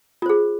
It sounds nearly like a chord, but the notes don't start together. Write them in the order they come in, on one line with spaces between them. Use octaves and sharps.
F4 C5 G#4